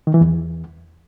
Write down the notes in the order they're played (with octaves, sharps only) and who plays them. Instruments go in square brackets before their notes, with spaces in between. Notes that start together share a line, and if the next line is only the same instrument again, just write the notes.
[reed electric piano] D#3
E3
E2